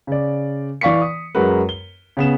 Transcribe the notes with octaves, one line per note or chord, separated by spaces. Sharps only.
C#3 D5
E3 D5 F5 C#6 B6 C#7
D#6
F#2 G#3 F#4 A#4 B4
G7
C#3 B3 E7